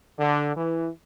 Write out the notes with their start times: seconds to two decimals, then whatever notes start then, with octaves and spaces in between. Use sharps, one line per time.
0.19 D3
0.56 E3